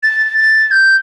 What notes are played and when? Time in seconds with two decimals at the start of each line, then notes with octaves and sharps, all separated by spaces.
0.03 A6
0.38 A6
0.71 G6